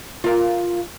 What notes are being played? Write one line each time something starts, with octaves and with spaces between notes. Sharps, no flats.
F4 A#4